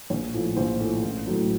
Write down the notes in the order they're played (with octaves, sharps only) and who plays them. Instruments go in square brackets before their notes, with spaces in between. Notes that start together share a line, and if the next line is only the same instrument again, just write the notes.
[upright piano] A#1 C#5
A2 F3
A#1 C5
A2 F3
A1
A2 F#3 A3